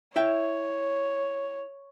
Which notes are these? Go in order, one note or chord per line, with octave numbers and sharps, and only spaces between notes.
E4 C#5 E5 G5